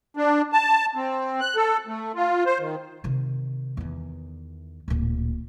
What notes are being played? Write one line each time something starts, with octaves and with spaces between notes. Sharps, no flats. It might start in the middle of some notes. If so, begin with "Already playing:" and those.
D4
A5
C4
F#6
A4
A3
F4
C5
D#3
C3 D#3
E2 D#3
D1 A#2